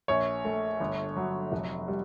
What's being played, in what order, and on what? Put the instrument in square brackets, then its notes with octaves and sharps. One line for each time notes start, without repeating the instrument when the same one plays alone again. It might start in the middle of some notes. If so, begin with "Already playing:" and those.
[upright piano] A#1 C#5
A3
G1
F#3
F1
G3